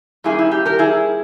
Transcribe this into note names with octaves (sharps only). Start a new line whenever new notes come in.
G2 G3 A#3 C#4 E4 G#4
E4
G4
G4 A#4
E4 G#4